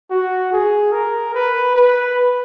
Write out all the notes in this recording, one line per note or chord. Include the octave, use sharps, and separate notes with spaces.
F#4
G#4
A#4
B4
B4